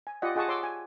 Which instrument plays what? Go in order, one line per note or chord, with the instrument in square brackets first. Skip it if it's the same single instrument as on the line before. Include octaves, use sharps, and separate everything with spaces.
[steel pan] G#5
F4 G4 D5 D#5 F#5
F4 G#4 D#5 F#5 A5 C#6
C#5 C6 D6 E6
G#5